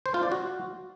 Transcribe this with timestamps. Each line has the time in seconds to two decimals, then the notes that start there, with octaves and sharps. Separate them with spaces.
0.06 C5
0.14 F4
0.23 D5
0.32 F#4